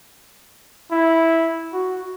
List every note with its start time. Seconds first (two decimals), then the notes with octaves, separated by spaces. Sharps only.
0.91 E4
1.73 F#4